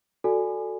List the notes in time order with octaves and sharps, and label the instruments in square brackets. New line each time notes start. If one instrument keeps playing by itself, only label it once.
[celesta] F#4 A4 D5 G#5